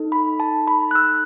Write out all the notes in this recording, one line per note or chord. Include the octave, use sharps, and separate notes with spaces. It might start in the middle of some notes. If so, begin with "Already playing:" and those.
Already playing: D#4 A4
B5
A5
B5
F#6
E6